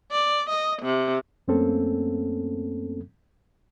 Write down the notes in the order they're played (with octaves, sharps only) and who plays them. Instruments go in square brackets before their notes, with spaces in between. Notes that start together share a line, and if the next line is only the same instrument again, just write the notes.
[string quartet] D5
D#5
C3
[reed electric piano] F#2 A3 A#3 C4 C#4 A4